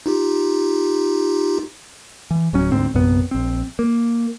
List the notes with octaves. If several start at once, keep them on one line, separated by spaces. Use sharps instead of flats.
D#4 F4 G4
E3
D1 F#3 C#4
D2 G#2 C4
A#1 F#2 C3 B3
A#1 C4
A#3